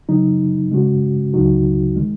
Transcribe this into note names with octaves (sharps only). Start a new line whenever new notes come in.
C#3 F#3 D#4
C#3 G#3 C#4 F#4
C#2 C#3 F#3 D#4 F#4
D#3 G#3